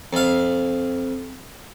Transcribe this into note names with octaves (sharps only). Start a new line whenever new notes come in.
F2 F5